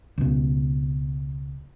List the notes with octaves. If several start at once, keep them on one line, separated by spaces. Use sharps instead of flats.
C#2 B2